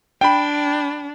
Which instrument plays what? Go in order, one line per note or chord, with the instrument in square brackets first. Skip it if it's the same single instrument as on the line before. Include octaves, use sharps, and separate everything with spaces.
[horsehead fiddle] D4 [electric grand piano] G5 B5